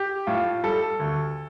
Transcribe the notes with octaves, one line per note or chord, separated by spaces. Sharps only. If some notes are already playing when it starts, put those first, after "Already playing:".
Already playing: G4
A2 F4
G3 A4
D2